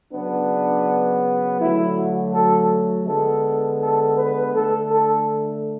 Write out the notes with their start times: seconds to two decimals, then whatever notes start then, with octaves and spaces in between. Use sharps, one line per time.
0.13 C#3 F#3 B3 D4
1.60 D3 F#3 A3 E4
1.97 F#4
2.34 A4
3.07 D3 G#3 B3 A4
3.81 A4
4.17 B4
4.54 D3 A3 A4
4.91 A4